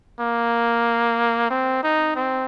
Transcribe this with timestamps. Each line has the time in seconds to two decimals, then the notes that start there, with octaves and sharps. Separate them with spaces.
0.20 A#3
1.50 C4
1.83 D#4
2.15 C4